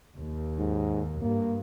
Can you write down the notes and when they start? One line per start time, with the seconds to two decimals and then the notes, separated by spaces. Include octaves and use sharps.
0.17 D#2
0.59 G#2
1.22 G2 A#3